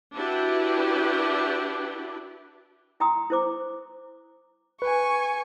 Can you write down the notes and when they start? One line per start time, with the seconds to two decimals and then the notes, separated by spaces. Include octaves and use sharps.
0.14 D4 E4 F#4 G4 B4
3.00 E4 G5 A#5 C6 D#6
3.30 E4 C5 D6
4.82 B4 G#5 C#6